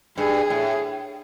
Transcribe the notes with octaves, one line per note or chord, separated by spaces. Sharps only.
G2 G#4
A2